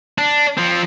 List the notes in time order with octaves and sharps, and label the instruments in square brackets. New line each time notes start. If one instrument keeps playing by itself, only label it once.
[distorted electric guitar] D4
F3 C4